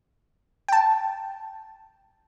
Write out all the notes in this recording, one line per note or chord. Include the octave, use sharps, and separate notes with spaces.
G5 A5